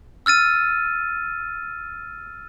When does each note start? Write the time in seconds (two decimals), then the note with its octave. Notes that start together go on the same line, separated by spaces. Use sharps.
0.26 E6 F6 A6 D#7